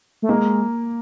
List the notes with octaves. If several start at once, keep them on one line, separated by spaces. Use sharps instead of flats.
A3
G#3 A#3